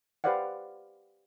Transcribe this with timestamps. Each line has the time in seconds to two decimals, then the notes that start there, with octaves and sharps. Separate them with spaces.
0.24 G4 B4 C5 D5 F5 F#5